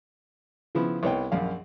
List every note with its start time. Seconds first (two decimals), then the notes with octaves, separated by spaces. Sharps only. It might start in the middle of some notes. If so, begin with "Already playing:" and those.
0.75 C#3 F3 B3 E4
1.03 C2 B3 C#5 D#5 G5
1.32 A#1 F#2 F5